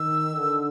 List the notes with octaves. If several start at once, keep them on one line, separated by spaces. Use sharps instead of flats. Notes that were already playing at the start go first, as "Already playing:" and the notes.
Already playing: D#3 E6
D3